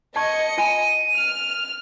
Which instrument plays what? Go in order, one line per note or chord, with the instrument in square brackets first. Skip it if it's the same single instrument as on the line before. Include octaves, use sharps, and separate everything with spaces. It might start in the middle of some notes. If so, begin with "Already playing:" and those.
[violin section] D#5 C#7 [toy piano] A5 C#6 [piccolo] G#6
[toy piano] F4 G#5 B5 [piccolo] D#7
[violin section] F6